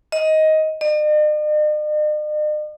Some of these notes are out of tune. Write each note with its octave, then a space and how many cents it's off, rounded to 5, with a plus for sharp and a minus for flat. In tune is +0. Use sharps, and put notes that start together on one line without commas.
D#5 +10
D#5 -45